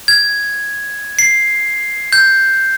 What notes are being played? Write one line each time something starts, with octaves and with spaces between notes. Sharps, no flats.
G#6
C7
G6